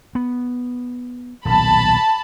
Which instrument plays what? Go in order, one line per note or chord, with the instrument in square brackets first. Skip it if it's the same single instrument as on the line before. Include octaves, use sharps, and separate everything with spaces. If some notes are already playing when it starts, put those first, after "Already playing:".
[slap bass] B3
[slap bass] D#1 B1 [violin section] A5 B5